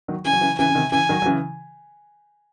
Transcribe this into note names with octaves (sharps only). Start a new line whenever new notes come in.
D#3 F#3
C#3 E3 G#5
F#3
C#3 E3
C#3 E3 G#5
C#3
C3 D#3
C#3 E3 G#5
D#3 F#3
F#3
C#3 E3